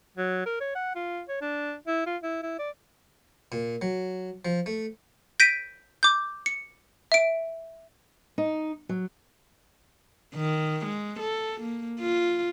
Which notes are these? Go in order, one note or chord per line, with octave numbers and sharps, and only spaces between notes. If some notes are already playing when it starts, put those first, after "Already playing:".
F#3
A#4
C#5
F#5
F4
C#5
D4
E4
F4
E4
E4
D5
A#2
F#3
F3
A3
G6 A#6 B6 D7 D#7
D6 G6
C#7
E5 D7
D#4
F#3
D#3
G#3
A4
A#3
F4